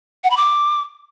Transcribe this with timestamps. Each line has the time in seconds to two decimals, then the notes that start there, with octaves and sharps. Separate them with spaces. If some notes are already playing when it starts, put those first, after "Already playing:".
0.24 F#5
0.30 B5
0.37 D6